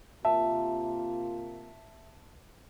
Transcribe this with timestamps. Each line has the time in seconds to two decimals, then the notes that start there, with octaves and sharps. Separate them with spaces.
0.25 C3 A#3 F4 E5 A5